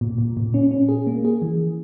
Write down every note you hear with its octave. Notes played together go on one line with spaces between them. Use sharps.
A#2
A#2
A#2
C#4
C#4
G#4
A#3
G#4
E3